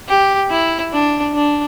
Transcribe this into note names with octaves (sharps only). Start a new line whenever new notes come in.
G4
E4
D4
D4